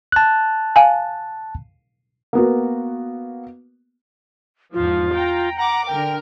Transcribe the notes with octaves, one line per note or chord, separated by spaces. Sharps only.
A5 F#6
F5 G#5
A#3 B3 F#4
E2 G#2 F3 F4
G5 A#5
F#5 A#5 D6
D3 A#4 G5